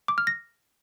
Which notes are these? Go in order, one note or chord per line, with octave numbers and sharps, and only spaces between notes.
D6
F6
A#6